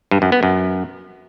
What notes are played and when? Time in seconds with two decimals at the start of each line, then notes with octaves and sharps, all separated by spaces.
0.11 G2
0.22 F#2
0.32 B3
0.43 F#2